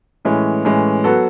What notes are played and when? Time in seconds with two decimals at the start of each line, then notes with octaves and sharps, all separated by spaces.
0.25 A2 E3 G#3 C#4
0.65 A2 E3 G#3 C#4
1.04 F#3 B3 F#4 A4